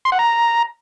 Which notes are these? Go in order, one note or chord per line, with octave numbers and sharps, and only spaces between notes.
C6
F#5
A#5